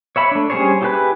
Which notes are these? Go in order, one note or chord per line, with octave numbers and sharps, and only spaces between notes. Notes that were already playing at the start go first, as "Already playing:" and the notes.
C#5 E5 B5
A3 D4
G3 C#4 G#4 C5 C#5
E4 G4 G#4 B4 F#6